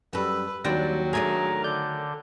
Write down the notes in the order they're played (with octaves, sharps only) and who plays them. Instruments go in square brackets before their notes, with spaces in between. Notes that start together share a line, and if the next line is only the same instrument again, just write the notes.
[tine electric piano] F#2 G3 [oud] F#4 A4 [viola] B4
[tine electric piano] D#2 G5 A#6 [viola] F#3 [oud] G3 C4 D4
[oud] D#3 A3 D4 [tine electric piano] G#4 G#6 [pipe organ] A#4 A#5
[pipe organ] D3 [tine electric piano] D5 G6